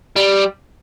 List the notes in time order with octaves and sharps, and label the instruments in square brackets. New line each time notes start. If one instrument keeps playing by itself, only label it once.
[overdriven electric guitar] G3